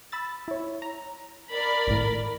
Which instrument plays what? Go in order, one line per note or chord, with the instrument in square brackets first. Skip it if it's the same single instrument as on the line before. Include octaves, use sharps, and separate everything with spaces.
[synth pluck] B5 E6 A6
E4 C#5
A#5
[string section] A#4 D5 B5
[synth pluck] G#1 A2